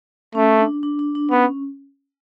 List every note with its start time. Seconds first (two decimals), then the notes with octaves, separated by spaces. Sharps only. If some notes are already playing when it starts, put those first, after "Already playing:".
0.35 A3 C#4
0.59 D4
0.83 D4
0.99 D4
1.15 D4
1.31 B3 C#4